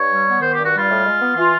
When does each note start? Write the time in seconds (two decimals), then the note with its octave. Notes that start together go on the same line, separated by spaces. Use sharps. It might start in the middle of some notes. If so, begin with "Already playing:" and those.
Already playing: G2 C#5
0.10 G3
0.26 B3
0.41 D#3 C5
0.53 G2 G4
0.64 F#4
0.73 G3 F4
0.89 A2
1.04 G#3
1.20 B3
1.36 E3 F4